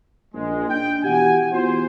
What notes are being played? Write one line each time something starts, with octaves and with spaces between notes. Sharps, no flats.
A#1 G#3
D4 G5
B2 E3 G4 F#5 G#5
E3 B3 F4 F#4 C5